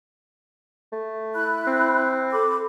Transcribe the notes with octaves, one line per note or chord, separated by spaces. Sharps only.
A3
E4 B5 F#6
C4
A4 B5 D6